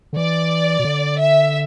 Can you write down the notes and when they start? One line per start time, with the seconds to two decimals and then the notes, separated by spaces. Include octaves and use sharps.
0.13 D3
0.17 E3 D5
0.79 B2
0.85 D3
1.19 E5